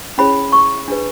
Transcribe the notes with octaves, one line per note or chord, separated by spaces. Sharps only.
C#4 E4 G#4 C#5 B5
C#6
D4 G#4 B4